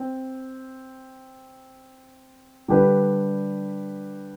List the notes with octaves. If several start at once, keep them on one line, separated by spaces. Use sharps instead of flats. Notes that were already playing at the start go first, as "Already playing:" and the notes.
Already playing: C4
D3 G3 D4 G4 B4